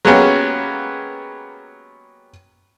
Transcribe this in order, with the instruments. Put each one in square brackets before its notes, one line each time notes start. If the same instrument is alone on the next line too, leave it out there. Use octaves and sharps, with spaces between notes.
[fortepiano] F#3 G#3 A#3 B3 C#4 G4